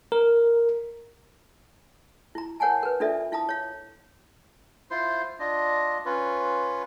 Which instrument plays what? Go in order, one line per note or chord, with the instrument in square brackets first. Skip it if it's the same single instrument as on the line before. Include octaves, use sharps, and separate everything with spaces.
[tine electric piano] A#4
[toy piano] E4 A#5
A#4 C#5 F#5 G#5 A5
A#4 B4
D4 F4 A4 D5 E5
E4 F5 A5 A#5 D#6
C#5 F5
[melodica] E4 F4 C5 C6
D4 F4 D#5
C#4 F4 B4